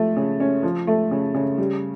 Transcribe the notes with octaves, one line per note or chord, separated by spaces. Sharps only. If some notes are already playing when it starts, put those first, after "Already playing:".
Already playing: F3 A3
C#3
C#4
F3
A3
C#3
C#3
G3